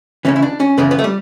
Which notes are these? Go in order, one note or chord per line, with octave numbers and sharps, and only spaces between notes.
D2 C#3 E3 C#4
E4
D4
C#4
F#2 C#3 E3 B3
B3
A3
G3